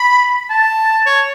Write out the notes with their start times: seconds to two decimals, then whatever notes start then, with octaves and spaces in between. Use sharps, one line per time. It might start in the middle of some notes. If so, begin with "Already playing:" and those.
Already playing: B5
0.50 A5
1.06 C#5